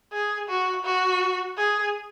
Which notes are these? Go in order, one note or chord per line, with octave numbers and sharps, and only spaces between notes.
G#4
F#4
F#4
G#4